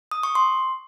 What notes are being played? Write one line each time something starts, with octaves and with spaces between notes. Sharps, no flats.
D#6
C#6
C6